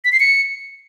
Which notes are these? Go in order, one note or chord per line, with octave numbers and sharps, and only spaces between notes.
B6
C7
C#7